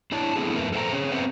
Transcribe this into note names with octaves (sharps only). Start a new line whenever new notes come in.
D4 E4 C#5 A5
A3 B3 C4 D4 E4 G#4
F2 A3 A#4 B4 E5
A4 A#4 C5 F5 G5 A#5
C4 C#4 G#4 C#5
B3 C4 B4 C5 E5 F#5